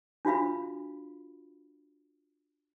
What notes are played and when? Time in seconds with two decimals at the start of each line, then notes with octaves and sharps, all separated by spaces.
0.25 D4 F4 F#4 F5 B5